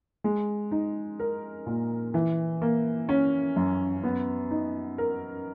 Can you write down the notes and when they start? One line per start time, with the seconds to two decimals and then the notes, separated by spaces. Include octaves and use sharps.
0.24 G#3
0.71 D#4
1.20 A#4
1.67 A#2
2.14 E3
2.62 A#3
3.09 C#4
3.56 F#2
4.03 B3
4.51 D#4
4.98 A#4